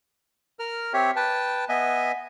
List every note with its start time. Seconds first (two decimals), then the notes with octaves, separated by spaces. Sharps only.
0.59 A#4 F6
0.93 C4 G4 C#5 E5
1.16 B4 G5 A5
1.69 B3 D#5 E5 G#5